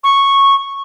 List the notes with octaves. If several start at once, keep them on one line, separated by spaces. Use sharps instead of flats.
C#6